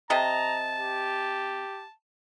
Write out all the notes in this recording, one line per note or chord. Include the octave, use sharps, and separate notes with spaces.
C3 D#5 A5 A#5
G4